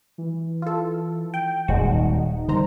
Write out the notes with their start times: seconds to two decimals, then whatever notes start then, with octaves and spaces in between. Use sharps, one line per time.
0.18 E3
0.62 F4 A4
1.34 G5
1.68 D#1 G#3 D#4 F#4
2.48 D3 D#3 F#3 G3 C5 A#5